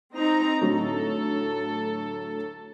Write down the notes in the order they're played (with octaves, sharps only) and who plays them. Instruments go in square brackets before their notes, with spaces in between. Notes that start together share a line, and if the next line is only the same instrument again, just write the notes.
[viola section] C4 D#4 A#5
[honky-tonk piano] A2 D3 F#3 [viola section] A4